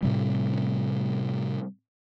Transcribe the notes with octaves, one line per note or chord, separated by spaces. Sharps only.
A2 C3 G3